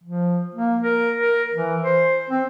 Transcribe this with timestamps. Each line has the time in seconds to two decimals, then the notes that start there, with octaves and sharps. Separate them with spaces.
0.04 F3
0.55 A#3
0.83 A#4
1.17 A#4
1.54 E3
1.83 C5
2.30 C4